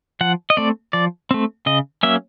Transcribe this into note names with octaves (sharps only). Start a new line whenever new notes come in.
F3 F#5
D#5
A3 C4 D5
F3 D5
A3 C4
C#3 D#5
F#3 A#3 C#4 E5